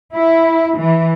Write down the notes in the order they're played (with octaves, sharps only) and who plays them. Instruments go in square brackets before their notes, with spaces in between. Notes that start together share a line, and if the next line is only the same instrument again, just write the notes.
[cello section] E4
E3